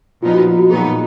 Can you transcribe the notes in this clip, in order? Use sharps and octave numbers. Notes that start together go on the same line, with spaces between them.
A#2 F3 B3 D#4 F4
F#4
F4
F#4
A#2 F#3 B3 D#4 G#4